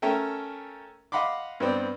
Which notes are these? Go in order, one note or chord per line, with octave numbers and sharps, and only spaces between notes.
A3 C#4 A4 A#4 E5 G5
D#5 F5 F#5 B5 C6 D6
G2 B3 C4 D5